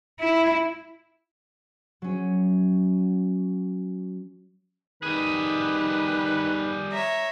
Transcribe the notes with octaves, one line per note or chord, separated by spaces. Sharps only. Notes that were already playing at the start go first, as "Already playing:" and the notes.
E4
F#3 C#4
D#3 G3 G#4 B4
C#5 E5 A#5